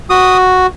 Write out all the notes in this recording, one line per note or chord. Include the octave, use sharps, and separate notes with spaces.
F#4 D#6